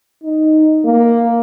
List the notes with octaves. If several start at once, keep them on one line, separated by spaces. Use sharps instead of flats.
D#4
A#3